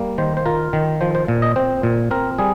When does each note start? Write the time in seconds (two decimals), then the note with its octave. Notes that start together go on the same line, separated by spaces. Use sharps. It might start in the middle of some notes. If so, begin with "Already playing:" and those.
Already playing: G3 A#3
0.18 D#3 C5
0.37 C5
0.46 F4 A#4
0.73 D#3
1.01 F3 C5
1.15 C5
1.28 A#2
1.42 D#5
1.56 C4 C5
1.83 A#2
2.11 C4 A#4
2.38 G3 G#4